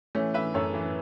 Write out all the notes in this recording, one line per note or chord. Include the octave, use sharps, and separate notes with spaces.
E3 A3 C#4
E3 B4 E5
F#2 A4 C#5
E3